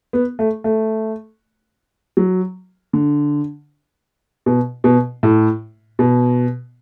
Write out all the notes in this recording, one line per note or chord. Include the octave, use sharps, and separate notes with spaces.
B3
A3
A3
F#3
D3
B2
B2
A2
B2